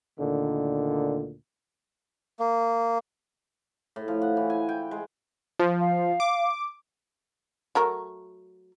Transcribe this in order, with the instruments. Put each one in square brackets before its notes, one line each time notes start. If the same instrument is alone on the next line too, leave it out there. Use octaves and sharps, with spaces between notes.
[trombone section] D2 A#2 D3 D#3
[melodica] A#3
[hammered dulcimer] A2
F3
F#5
E3
G#5
G5
G#3
[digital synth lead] F3
[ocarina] F5
[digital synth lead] D6
[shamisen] F#3 A3 A#4